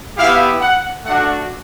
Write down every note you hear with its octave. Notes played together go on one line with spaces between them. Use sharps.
B3 E4 G4 F5
F#5
A3 D4 F#4 F#5